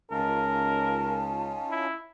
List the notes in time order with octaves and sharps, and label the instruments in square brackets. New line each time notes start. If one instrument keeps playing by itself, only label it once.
[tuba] C#2 [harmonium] C#4 D#4 F4 [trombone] A#4 [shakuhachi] A5
[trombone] E4